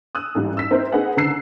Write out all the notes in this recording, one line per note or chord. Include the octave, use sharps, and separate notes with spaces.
D#6 E6 F#6
A1 G#2 G3
E6 B6
C4 D#4 E4 A#4 C5
C4 D#4 G#4 B4 F#5
C#2 D3 A#5 E6 F#6 C7